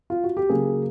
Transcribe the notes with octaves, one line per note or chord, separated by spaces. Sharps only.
F4
F#4
G4
C#3 F#3 A#3 G#4